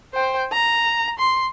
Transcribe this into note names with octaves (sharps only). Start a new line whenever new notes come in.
C5 G5
A#5
C6